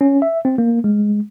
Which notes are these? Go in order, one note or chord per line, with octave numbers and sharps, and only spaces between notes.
C#4
E5
C4
A#3
G#3